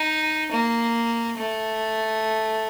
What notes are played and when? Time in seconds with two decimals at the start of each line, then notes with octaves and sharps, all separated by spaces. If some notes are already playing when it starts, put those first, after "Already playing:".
Already playing: D#4
0.51 A#3
1.38 A3